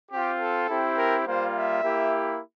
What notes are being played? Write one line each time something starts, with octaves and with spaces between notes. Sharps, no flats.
C4 F4 G4
A4
C4 E4 G4
A#4
G3 A#3 F4 C5
E5
A#3 E4 G4